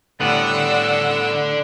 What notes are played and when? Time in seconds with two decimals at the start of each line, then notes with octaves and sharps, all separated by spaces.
0.20 A2 D3 G3 B3 D4 F#5 E6